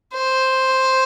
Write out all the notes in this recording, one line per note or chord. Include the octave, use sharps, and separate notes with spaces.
C5